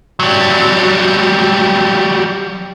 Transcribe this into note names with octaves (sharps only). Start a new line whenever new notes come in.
F#3 G3